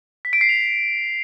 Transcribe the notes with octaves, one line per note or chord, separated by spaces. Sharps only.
B6
D7
C7
F7